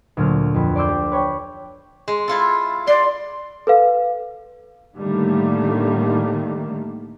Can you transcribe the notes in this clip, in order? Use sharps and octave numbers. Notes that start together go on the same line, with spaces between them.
D2 A#2 F#3 F6
F2 B4
D5 C6 D6 E6 G6
G4
B4 C#5 G5
G#3
E4 F4 A4
D5 C6
A4 B4 F5
A2 D3 D#3 G3 A3 A#3